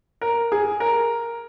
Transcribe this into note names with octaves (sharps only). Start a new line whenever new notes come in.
A#4
G#4
A#4